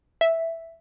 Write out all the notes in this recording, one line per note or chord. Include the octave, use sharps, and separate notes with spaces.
E5